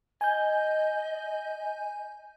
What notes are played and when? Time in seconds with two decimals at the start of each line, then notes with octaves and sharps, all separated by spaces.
0.21 D#5 G#5 G6